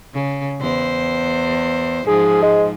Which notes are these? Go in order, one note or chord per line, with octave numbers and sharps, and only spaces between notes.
C#3
E2 C5
G#2 F3 G#4
G#3